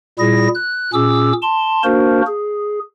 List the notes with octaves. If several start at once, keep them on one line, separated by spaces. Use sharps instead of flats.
A#2 G3 E4 G#4 A#6
F#6
A#2 C#4 G#4 D6 E6
A5 C6
A#3 D4 F#4 A#4 C5
G#4